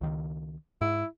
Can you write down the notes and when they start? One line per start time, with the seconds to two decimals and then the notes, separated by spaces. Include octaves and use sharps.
0.01 C#2 D#3
0.81 G#2 E4